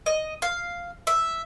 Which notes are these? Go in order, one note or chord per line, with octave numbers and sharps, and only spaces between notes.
D#5
F5
E5